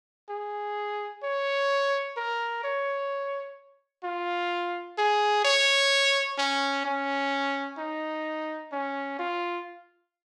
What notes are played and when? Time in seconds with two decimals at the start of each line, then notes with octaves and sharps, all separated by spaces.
0.29 G#4
1.23 C#5
2.17 A#4
2.64 C#5
4.04 F4
4.98 G#4
5.45 C#5
6.38 C#4
6.85 C#4
7.78 D#4
8.72 C#4
9.19 F4